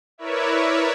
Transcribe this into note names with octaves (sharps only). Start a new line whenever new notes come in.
E4 A#4 B4 C#5 D5 E5